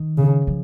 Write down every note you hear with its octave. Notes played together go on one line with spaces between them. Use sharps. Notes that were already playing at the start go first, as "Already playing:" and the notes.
Already playing: D#3
C#3
F3